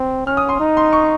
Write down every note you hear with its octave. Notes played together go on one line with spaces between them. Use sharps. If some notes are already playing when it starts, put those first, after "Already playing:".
Already playing: C4
C#4 F6
D#6
C6
D#4
C6
C#6